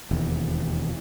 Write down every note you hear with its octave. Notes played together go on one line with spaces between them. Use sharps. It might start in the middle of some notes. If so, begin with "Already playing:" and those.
E1 D#2